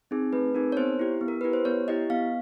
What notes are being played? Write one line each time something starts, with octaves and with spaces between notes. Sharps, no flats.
C4 D#4 G#4
A3 B4
C4 D#4 G#4 A#4
C#5
B3 C5
E4 G4
B3
A#4
E4 G4 B4
C5
B3 C#5
E4 G4 D#5
B3 F5